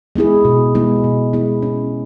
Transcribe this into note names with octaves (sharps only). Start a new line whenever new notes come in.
G#3 B3 E4 G#4
B2
G#3 B3 E4 G#4
B2
G#3 B3 E4 G#4
C#4